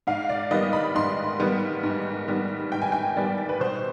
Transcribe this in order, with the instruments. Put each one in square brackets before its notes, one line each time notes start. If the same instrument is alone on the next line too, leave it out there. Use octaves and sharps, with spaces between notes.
[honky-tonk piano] G#2 F5
D5
D#3 G3 B3 D#5
B5
G#2 C6
D#3 G3 B3
G#2
D#3 G3 B3
G#2 G5
G#5
G5
D#3 G3 B3 D5
B4
B2 C5